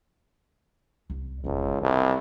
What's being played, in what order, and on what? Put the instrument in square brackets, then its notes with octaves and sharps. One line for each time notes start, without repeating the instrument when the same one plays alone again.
[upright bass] C2
[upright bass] E1 D4 [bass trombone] C#2
[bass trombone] C2 [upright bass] D#3